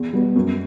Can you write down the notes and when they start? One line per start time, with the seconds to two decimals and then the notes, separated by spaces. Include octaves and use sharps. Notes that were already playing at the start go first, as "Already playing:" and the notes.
Already playing: E2
0.13 B2 G3 B3
0.36 F#2